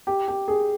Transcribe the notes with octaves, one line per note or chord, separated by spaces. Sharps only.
G4
G4
G#4